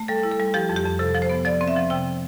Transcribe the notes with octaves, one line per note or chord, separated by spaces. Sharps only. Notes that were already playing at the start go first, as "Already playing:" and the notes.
Already playing: A3
G3 A4
E4
A4
G3
F3 G4
F2
G4
F2
C3 A4
F3
C5
B3
F3 D5
C4
E5
F3
C3 G5